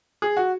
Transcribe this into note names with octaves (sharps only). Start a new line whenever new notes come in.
G#4
F#4